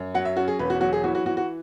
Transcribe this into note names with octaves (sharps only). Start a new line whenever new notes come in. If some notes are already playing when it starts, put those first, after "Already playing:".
Already playing: F#2
F#3 F#5
E5
C#4 F#4
G#4
E1 B4
F#4
F#3 F#4
G#4
E3 F#4
F#4
E3 F#4
F#4